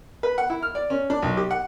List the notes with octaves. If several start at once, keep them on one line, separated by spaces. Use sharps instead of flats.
B4
F#5
E4
F6
D5
C#4
D4
B1
G4
F#5